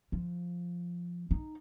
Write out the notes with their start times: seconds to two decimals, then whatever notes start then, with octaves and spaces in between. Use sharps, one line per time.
0.12 F3
1.31 D#4